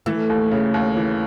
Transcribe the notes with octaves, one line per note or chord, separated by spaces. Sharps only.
E3 A3
D#2
C#3
D#2
E3